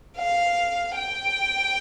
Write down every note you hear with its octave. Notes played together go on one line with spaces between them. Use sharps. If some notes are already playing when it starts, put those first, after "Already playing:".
F5
G5